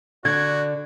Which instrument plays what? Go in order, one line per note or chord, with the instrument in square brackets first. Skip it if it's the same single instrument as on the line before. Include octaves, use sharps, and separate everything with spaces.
[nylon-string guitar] D3 [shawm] F#4 [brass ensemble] D5 [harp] G#6